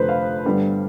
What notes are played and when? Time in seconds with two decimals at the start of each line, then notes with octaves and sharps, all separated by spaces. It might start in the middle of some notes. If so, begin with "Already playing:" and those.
Already playing: F1 F2 D3 F3 B4 C5
0.09 F5
0.45 G2 D3 G3 B3